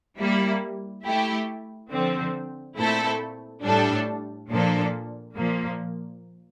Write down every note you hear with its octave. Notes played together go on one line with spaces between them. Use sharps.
G3 A#3 E4
A3 E4 G4
D3 F3 C4
A#2 A3 C4 E4 A4
A2 G3 D4 A4
A#2 F3 A#3 D4 A4
A#2 F3 A#3